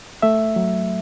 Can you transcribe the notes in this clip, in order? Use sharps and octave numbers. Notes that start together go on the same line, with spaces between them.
A3 E5
F#3